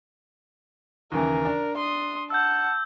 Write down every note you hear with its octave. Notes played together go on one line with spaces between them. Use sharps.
D#2 C#3 E3 A#4
D4
C6 D#6
F#5 A5 E6 G6